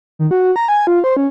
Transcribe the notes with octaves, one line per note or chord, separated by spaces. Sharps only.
D#3
F#4
A#5
G#5
F4
C5
C#4